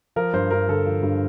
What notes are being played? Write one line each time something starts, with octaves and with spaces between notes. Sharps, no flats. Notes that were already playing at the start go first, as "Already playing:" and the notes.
F3 A#4
G2 C5
G2 A#4
D3 A4
F3
G2